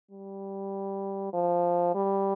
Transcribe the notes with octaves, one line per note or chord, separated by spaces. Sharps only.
G3
F3
G3